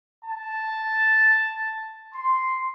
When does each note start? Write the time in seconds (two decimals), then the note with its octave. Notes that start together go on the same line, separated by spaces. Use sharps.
0.24 A5
2.13 C6